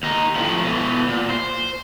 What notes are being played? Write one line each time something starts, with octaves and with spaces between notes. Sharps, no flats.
D#2 D#4
A2 F3
B2 E3
A#2
C5